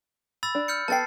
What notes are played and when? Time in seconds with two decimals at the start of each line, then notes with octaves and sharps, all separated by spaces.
0.43 B5 E6 A6
0.55 D4
0.68 F6 G6 C#7
0.88 B3 A4 G5 A5 A6 C7